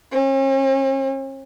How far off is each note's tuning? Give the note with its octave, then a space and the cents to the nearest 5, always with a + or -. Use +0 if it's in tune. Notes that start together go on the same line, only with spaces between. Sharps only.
C#4 -45